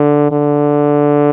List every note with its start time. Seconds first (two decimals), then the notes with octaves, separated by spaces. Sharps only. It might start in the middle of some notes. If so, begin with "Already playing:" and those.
Already playing: D3
0.32 D3